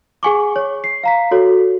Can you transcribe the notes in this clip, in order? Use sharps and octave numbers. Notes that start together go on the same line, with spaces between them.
G#4 F#5 G#5 C#6 D6
C#5 C#6
C7
F5 A#5 B6
F#4 A4 C#5